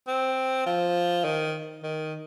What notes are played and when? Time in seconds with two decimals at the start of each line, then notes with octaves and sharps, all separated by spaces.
0.08 C4
0.66 F3
1.24 D#3
1.83 D#3